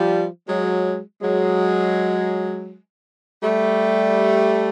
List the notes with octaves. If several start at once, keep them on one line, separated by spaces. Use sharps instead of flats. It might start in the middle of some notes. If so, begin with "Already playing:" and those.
Already playing: F3 G3
F#3 G#3
F#3 G#3
G3 A3